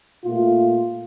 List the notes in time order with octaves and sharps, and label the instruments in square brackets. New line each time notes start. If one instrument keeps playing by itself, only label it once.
[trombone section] A#2 A3 F4